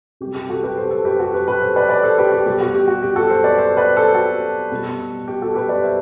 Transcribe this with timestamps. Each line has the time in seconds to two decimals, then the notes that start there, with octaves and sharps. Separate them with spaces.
0.21 C3 G3 G4
0.35 G4
0.49 F#4 A4
0.63 G4 B4
0.77 A4 C5
0.91 A4 C5
1.05 G4 B4
1.19 F#4 A4
1.33 G4 B4
1.48 G4 B4
1.62 A4 C5
1.76 B4 D5
1.89 B4 D5
2.03 A4 C5
2.18 G4 B4
2.32 G4
2.46 B2 G3 G4
2.61 F#4
2.74 G4
2.88 F#4
3.03 G4
3.16 F#4 A4
3.30 A4 C5
3.44 B4 D5
3.58 A4 C5
3.77 B4 D5
3.96 A4 C5
4.14 F#4 A4
4.72 B2 G3
5.28 G4
5.42 F#4 A4
5.55 G4 B4
5.69 B4 D5
5.83 C5 E5